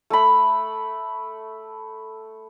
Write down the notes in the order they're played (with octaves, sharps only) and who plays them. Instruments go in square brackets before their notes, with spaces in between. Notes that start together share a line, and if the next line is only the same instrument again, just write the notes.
[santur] A3 B5